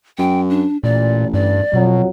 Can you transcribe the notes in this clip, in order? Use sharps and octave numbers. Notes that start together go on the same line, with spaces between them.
F#2 G5
D4
A1 A#2 D5
G2 D5
F2 B2 F#3